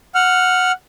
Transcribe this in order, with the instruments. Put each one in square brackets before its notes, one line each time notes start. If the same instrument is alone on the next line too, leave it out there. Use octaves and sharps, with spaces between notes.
[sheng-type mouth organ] F#5 F6